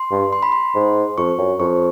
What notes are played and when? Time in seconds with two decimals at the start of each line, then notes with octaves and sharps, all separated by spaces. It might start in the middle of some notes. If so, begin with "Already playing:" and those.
Already playing: C6
0.11 G2
0.33 C6
0.43 B5
0.52 C6
0.75 G#2
1.18 F2 C#6
1.38 F#2
1.60 F2 C#6